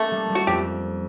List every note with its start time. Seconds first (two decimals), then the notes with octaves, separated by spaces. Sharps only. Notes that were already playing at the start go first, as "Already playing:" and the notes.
Already playing: A3 A#3 C#4 A4
0.11 G3
0.29 G3
0.35 F#4
0.47 F2 G4